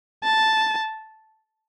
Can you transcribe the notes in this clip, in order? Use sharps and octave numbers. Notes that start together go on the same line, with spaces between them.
A5